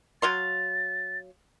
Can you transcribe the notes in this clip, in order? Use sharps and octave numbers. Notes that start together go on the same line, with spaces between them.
F#3 F5 C6 A6